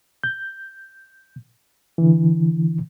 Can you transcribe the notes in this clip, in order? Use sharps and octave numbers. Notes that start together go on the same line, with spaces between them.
G6
D3 E3